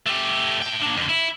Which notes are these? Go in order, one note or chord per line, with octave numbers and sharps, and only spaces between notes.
A3 G4
A2 G5
A#3 D4
F2 D3
E4